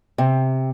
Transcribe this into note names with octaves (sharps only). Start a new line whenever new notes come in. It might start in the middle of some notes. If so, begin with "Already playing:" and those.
C3